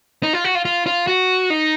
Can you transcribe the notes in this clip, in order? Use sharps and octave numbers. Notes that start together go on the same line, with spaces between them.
D#4
F4
F#4
F4
F4
F4
F#4
D#4